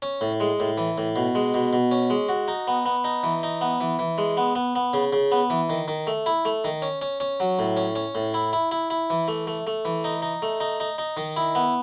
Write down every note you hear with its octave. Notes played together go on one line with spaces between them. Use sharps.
C#4
A2
G#3
A2
E3
A2
B2
G#3
B2
B2
C#4
G#3
F#4
D#4
B3
B3
D#4
E3
D#4
B3
E3
E3
G#3
B3
B3
B3
C#3
C#3
B3
E3
D#3
D#3
A3
E4
A3
D#3
C#4
C#4
C#4
F#3
A2
C#4
C#4
A2
E4
E4
E4
E4
E3
A3
A3
A3
E3
D#4
D#4
A3
D#4
D#4
D#4
D#3
E4
B3